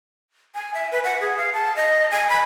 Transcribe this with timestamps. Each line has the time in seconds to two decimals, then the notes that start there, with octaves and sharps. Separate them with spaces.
0.55 G#5
0.74 E5
0.92 B4
1.04 F#5
1.21 G#4
1.37 F5
1.54 A5
1.76 D#5
2.11 G#5
2.29 B5